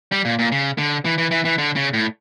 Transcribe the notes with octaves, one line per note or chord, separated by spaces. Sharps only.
G3
A#2
A#2
C#3
D3
E3
E3
E3
E3
D3
C#3
A2